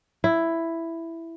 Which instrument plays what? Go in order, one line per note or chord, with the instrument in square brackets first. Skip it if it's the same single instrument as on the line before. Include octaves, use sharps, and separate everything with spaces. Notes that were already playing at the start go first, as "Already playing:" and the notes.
[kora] E4